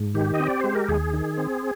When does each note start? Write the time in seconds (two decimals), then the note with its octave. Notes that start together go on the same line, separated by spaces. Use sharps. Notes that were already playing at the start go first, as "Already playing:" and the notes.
Already playing: G#2
0.15 D#3 G4
0.34 D#5
0.40 C4
0.47 D5
0.61 G#3 C5
0.75 A#4
0.88 D#2 G#4
1.13 D#3
1.37 C4